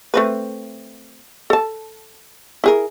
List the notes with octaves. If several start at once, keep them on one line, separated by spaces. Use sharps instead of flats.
A3 C4 B4
A4 A5
E4 G#4 A#4